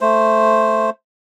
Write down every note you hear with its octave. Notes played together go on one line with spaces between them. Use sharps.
A3 C5